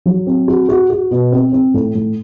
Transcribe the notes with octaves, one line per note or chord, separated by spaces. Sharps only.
F#3
C4
F#4
F#4
F#4
B2
C4
C4
A2
A2